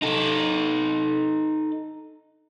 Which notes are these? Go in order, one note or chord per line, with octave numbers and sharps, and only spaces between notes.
D#4 A4